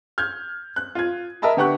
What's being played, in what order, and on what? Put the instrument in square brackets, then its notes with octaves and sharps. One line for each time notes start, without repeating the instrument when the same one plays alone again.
[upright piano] F6 G6 G#6
F#6
F4 G#6
A#4 D#5 E5 A5 B5
D3 B3 G4 F#5 C#6 F#6